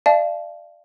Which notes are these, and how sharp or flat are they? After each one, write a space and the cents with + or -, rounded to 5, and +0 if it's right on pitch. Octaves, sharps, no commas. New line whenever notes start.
D5 +25 F5 -35 A5 -30